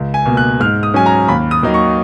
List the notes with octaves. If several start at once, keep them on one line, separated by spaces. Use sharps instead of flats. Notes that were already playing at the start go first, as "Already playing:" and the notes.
Already playing: C#2
G#5
B2 A#3
F#6
G#2 F6
D#6
F#3 C#4 G#5
A#5
D#2 B5
D#6
D#3 F#3 A#3 D#4
C#6